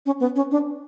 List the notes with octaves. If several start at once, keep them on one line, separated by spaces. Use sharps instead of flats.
C#4
B3
C#4
D4